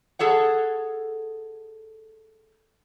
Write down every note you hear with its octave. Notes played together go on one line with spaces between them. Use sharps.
G#4 A4 C#5 F#5